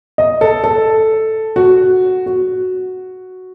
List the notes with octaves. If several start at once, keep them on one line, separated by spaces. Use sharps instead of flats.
D#5
A4
A4
F#4
F#4